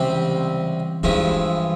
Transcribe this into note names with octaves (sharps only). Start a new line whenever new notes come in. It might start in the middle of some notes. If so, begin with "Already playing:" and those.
Already playing: C#2 C3 E3 G3 C4
G2 E3 F3 G#3 E4